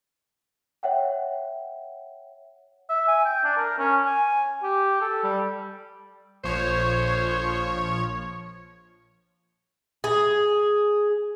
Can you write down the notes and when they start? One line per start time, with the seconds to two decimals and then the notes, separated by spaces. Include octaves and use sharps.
0.83 C#5 E5 F#5 G5
2.90 E5
3.08 G#5
3.25 G5
3.44 D4
3.57 A#4
3.79 C#4
4.06 G#5
4.63 G4
5.01 A4
5.24 G3
6.44 A#1 F3 C5 C#5
10.04 G#4